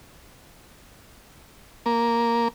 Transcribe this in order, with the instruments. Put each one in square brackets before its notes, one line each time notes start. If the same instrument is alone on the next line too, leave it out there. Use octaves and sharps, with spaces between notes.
[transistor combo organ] A#3